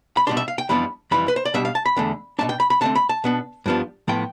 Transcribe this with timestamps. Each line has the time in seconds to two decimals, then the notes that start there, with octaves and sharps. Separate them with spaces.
0.17 B5
0.27 B2 G3 D4 C6
0.37 E5
0.48 F5
0.58 G5
0.69 F2 E3 G3 B3 D4 B5
1.11 F2 E3 G3 B5
1.28 B4
1.36 C5
1.45 D5
1.54 B2 G3 D4 E5
1.65 F5
1.75 A5
1.86 B5
1.97 E2 D3 A3
2.39 B2 A3 D4 A5
2.49 G5
2.60 B5
2.70 B5
2.81 D3 A3 C4 A5
2.95 B5
3.09 A5
3.24 B2 B3 D4
3.66 G2 F3 B3 D4
4.08 A2 F3 B3 G5